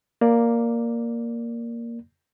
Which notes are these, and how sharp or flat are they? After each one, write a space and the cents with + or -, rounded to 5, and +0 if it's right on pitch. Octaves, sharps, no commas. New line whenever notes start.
A#3 +0 D5 +0